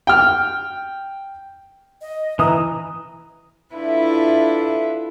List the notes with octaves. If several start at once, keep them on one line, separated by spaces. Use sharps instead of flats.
G5 F6
D#5
E3 A#5 D#6
D4 E4 F4 A4 B4 E5